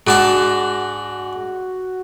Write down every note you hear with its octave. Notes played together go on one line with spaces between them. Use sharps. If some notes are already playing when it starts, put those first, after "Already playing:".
G#2 D4 F#4 A5